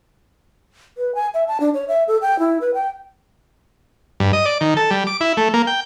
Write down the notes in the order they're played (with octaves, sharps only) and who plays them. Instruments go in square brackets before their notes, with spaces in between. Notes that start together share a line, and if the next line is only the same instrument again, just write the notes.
[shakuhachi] B4
G#5
E5
A5
D4
C#5
E5
A4
G5
E4
B4
G5
[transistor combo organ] G2
D#5
D5
D#3
A4
G3
D6
E4
A3
A#3
G5